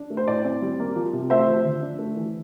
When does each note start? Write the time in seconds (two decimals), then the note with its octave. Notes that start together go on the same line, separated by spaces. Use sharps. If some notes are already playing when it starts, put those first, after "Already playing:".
Already playing: D4
0.10 A3
0.17 C5
0.28 A2 D5
0.44 C4
0.62 G3
0.80 A#3
0.96 F3
1.13 C3
1.30 A3 C5 E5
1.47 F3
1.65 D3
1.82 D4
1.99 A3
2.16 E3